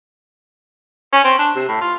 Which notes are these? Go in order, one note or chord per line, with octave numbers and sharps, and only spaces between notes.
C#4
C4
D4
C3
A2
F4